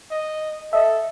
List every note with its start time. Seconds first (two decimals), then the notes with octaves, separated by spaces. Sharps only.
0.11 D#5
0.73 A4 D#5 E5